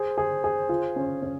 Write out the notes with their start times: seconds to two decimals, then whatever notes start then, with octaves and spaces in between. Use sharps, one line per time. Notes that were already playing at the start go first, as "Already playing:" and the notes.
Already playing: G#4 C5
0.18 G#4
0.44 G#4
0.69 F4
0.96 C#4
1.22 C#4